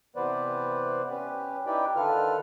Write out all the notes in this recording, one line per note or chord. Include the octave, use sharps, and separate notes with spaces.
C3 E3 B3 B4 C5 D5
C#4 G4 B4
D#4 E4 G4 B4 D5 G5
D3 D#3 F4 A4 B4 F6